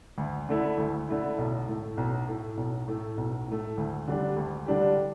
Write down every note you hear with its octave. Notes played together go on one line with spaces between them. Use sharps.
D2
D3 A3 E4
D2
D3 A3 E4
B1
A2 A3
B1
A2 A3
B1
A2 A3
B1
A2 A3
D2
D3 G3 D4 G4
D2
D3 G3 D4 G4